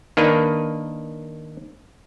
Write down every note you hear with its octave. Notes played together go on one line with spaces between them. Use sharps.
D#3 A#3 D4 B4